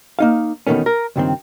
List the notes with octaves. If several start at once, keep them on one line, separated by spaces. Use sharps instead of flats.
A#3 D#4 F5
E2 B2 D3 D#3 A3 C#4
A#4
C#2 G2 D#3 C4